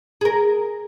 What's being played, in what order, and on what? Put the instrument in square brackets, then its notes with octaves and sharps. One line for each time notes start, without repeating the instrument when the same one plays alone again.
[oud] G#4 A#4